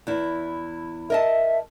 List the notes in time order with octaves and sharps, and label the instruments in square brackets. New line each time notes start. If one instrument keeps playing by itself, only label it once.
[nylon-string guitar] E2 E4
[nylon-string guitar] A#4 D#5 A5 [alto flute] E5